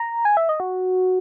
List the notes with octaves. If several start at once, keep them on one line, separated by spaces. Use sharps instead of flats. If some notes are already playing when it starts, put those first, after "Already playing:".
Already playing: A#5
G#5
E5
D#5
F#4